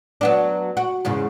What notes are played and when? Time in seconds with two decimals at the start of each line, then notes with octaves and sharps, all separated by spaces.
0.21 F#3 B3 D4
0.77 F#4
1.05 E2 G#2 C#3